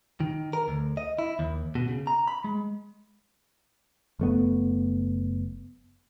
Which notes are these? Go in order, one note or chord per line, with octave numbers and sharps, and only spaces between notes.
D#3
A#4
D2
D#5
E4
D#2
B2
C#3
A#5
B5
G#3
F#1 A3 B3